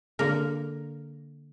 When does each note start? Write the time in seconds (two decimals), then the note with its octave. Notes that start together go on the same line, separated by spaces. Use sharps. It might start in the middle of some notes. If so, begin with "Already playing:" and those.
0.19 D3 A#3 A#4